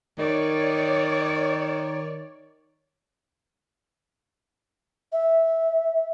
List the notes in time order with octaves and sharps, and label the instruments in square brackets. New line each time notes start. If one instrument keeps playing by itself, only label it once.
[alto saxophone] D#3 [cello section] C#5 D5
[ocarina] E5